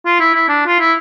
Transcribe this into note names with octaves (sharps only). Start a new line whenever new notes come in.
F4
E4
E4
D4
F4
E4